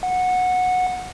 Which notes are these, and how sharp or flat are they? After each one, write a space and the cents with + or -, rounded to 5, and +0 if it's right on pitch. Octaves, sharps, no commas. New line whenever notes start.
F#5 -15